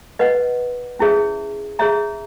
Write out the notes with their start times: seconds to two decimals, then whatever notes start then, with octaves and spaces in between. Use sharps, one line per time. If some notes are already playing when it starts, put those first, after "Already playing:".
0.19 B4 D#5 F#5
0.99 C#4 E4 G#4 C#5 E5
1.79 G#4 C#5 E5 A#5